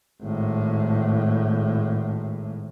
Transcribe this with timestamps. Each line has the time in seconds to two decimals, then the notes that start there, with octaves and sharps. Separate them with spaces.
0.22 G#1 A2